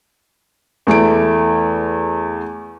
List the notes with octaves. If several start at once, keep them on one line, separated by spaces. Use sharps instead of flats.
E2 A3 E4 D7